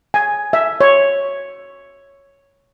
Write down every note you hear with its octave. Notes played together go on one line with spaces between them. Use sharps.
G#5
E5
C#5